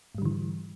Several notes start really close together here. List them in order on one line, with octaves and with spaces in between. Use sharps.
G#2 G3 D3 E3